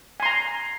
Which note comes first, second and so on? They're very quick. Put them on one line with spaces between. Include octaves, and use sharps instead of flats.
G#5 C6 A#5